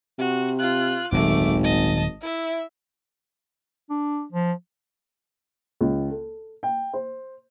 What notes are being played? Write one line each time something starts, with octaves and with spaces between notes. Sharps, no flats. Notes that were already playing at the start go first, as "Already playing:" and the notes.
C3 F#4
F4 F#6
D#1 G#1 F#3 A3 D6
D#5 A5
E4 E5
D4
F3
C#2
A4
G5
C5